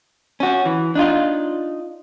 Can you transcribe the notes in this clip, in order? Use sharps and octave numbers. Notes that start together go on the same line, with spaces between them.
C#4 F#4
E3
D4 D#4 F4